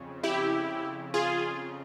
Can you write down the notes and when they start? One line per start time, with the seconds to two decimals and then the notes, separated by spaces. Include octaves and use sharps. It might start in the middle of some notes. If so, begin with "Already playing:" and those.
Already playing: F2 C#3
0.23 E4 G4
1.14 F4 G#4